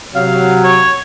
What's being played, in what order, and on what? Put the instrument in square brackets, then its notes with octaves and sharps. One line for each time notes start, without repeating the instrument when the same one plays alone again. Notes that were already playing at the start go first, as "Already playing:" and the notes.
[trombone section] C3 F#3 [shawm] F5
[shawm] C#5